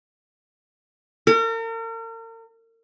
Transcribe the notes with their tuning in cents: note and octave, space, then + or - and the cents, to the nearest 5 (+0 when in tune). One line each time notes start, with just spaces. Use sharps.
A#4 -40